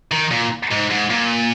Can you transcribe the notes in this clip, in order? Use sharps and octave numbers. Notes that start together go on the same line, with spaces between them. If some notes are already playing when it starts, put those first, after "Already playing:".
D#3
A#2
G#2
G#2
A#2